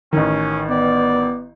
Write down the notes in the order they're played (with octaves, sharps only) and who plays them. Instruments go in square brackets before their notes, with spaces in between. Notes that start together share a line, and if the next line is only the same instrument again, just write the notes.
[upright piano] A1 D#3 [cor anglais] C#4
[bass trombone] B3 [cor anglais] D5